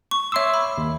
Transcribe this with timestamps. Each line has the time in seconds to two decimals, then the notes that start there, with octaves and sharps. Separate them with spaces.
0.11 C#6
0.32 C#5 E5 C6 D6 E6
0.54 B5
0.78 D#2